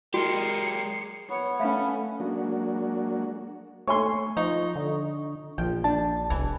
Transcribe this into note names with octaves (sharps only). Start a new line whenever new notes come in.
G#3 F#4 G4 A#4 C7 C#7
B3 C#5
A3 C#4 E5 F5 B5
F#3 G#3 A#3 D4 F#4
A3 C#5 G#5 C6 C#6
F3 D#4
D3
A#1 F3 G5
D4 A5
E1 C2 E3